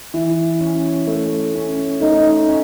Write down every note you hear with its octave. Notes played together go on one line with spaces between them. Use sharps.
E3
C#4
A3
C#4
A3 D#4
C#4